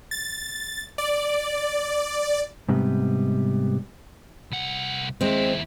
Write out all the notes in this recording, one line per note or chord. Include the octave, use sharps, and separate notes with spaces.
A6
D5
G#2 C3 G3 B3
C2 F#5
D#2 G#3 C4 E4